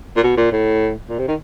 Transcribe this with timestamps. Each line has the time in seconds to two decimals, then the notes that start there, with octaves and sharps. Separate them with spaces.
0.16 A#2
0.23 B2
0.37 A#2
0.52 A2
1.09 A#2
1.19 C3
1.28 D#3